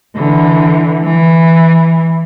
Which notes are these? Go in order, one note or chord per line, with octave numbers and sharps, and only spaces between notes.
D3 E3
E3